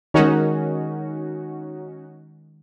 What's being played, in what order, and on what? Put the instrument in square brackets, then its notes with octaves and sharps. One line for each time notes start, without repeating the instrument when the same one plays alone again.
[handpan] D#3 G#3 [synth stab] C#4 D#4 F#4